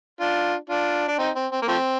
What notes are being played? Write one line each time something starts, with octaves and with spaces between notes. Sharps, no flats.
D4 F4
D4 F4
D4
C4 D#4
C4
C4
A#3
F3 A3 C4